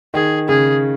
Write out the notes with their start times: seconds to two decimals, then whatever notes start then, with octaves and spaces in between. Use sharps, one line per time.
0.14 D#3 G#4
0.48 C#3 G#4